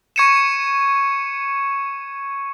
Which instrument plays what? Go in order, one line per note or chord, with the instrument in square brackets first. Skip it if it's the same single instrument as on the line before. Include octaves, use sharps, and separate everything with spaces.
[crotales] C#6 G#6 C#7 D#7 E7